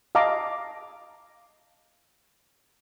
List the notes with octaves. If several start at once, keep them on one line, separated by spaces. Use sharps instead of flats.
D#5 F5 A5 A#5 D6